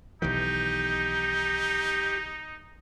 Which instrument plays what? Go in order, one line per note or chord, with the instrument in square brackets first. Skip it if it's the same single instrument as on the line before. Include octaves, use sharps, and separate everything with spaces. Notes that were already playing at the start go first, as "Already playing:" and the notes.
[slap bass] B1 D#3 E3 [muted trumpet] D#4 [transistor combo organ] G4